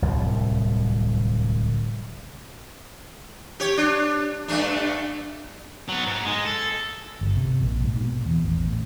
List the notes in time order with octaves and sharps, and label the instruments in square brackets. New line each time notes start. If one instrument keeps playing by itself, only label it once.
[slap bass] D1 C2 F3
[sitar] G4 C#5
D4
G2 A3 D4
[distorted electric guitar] F#3 B3
G#2
G#3
A4
[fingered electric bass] G1
C3
A#1
G#2
B2
E2
A1
A1